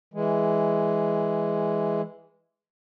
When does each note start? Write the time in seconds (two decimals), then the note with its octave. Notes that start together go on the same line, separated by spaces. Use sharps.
0.14 E3 G#3